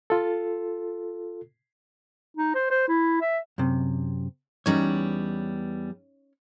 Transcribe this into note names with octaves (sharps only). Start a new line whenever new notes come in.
F4 A4
D#4
C5
C5
E4
E5
F#2 C3
E2 G3 C#4 D#4 B4 C#5